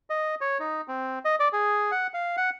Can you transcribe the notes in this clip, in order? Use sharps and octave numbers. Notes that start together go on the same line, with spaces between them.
D#5
C#5
D#4
C4
D#5
D5
G#4
F#5
F5
F#5